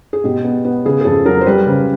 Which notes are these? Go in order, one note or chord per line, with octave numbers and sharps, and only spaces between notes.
G#4
B2 G4
B3
B3
C#3 G#4
G#4
F2 A4
F#3 A#4
C5
G3 B4
C#3